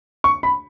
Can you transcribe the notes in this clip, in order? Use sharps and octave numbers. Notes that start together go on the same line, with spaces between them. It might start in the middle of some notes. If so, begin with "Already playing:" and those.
C#6
B5